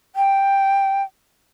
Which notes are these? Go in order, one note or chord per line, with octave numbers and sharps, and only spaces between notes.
G5